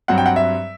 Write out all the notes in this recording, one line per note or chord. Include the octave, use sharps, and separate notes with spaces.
G2 F#3 C4 F#5
G5
F#5
E5